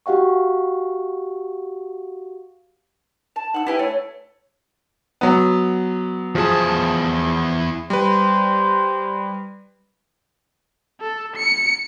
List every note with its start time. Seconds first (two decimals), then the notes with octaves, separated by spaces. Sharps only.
0.06 F#4 G4 F5 F#5 C#6
3.36 A5
3.54 D#4 F#5 E6
3.66 E4 G4 B4 G#5
3.79 A3 C#5
5.21 F#3 B3
6.35 E2 F3 G#4 A5
7.90 G3 B4 C5
11.01 A4
11.37 C#7